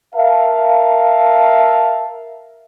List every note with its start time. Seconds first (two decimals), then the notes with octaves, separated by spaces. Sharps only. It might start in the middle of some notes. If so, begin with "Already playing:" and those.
0.15 A#4 E5 F5 A5